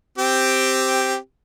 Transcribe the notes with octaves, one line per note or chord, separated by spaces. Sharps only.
C4 G4